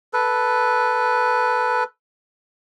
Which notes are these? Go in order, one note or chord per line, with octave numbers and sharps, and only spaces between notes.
A4 B4